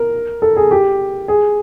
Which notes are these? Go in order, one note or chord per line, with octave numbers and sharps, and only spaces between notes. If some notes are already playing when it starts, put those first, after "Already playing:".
Already playing: A#4
A4
G#4
G4
G#4